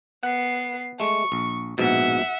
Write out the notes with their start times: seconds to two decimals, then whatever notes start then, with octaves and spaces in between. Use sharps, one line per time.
0.23 B3 F#5 C7
1.00 G#3 A3 C#6
1.32 A#1
1.78 A#1 G#2 B2 E5 F#5